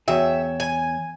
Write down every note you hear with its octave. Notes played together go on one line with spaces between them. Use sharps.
E2 F#4 G#4 C#5 E5 G5
G#5